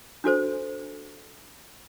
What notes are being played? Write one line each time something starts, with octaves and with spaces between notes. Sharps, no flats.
D4 F#4 A4 C5